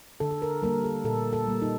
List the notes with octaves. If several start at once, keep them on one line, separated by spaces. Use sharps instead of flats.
D3 A4
A4
A#4
G3 A#3 A#4
A4
A#2 A4
A4
G3 A#3
D#4